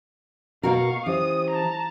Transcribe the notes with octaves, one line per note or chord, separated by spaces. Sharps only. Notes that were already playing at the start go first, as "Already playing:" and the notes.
B2 F#4 A#4 F5 C#6
E3 C#4 G4 C5 D#6
A5 A#5